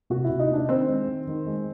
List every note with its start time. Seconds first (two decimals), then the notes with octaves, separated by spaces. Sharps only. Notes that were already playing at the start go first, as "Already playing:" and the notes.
0.10 C3 F#4
0.24 E4
0.30 C3
0.39 D#4
0.49 A#3 D4
0.68 D#3 C4
0.88 G#3
1.08 D#3
1.27 D#3
1.47 G#3